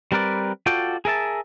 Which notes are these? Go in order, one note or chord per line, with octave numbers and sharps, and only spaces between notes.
G3 C4 A#4 B4 D5
F4 F#4 A4 D5 G5
G#4 A#4 E5 A5